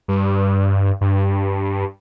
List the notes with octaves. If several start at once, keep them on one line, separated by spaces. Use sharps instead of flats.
G2
G2